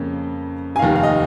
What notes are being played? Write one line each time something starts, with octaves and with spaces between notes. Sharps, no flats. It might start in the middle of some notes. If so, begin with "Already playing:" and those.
Already playing: F2 C#3 A#3 C#4
G#5
F1 D#2 D#3 F5
F5
D#5